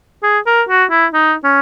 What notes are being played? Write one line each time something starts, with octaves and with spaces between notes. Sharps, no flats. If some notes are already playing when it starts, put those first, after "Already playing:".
G#4
A#4
F#4
E4
D#4
C#4